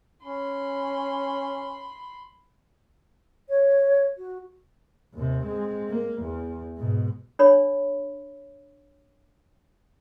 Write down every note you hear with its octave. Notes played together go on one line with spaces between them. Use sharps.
C#4 B5 C6
C#5
F#4
D#2 C3
G#3 C4
A#3
E2
G#2 B2
D4 C#5 B5